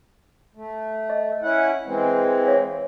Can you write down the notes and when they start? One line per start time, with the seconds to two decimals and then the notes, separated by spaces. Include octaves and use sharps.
0.55 A3
1.10 D#5
1.42 C#4 E4 F#5
1.86 E3 G#3 C4
2.46 C#5 E5 F5